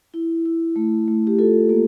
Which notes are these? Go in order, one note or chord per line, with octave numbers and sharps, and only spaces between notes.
E4
E4
A3
A3
G4
F4 A4
A#3